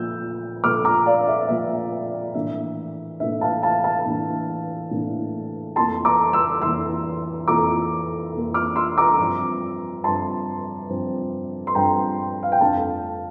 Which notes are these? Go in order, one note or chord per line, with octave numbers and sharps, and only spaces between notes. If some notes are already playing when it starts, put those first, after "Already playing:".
Already playing: A#2 F3 A3 E6 G6
A#2 F3 A3 D6 F6
A#5 D6
D5 F5
E5
A#2 F3 A3 E5
A2 E3 A#3 D4 E5
A2 E3 A#3 D4 E5
F5 A5
F5 A5
F5 A5
A2 E3 A#3 D4
A2 E3 A#3 D4
F2 E3 A#3 A5 C6
A#5 D6
C6 E6
F2 E3 A#3 C6 E6
F2 E3 A#3 A#5 D6
F2 E3 A#3
D6 F6
C6 E6
A#5 D6
G2 F3 C4
G2 F3 C4 A5 C6
G2 F3 C4
C6
G2 F3 C4 G5 A#5
F5
G5
F2 D3 A3 D4 F5 A5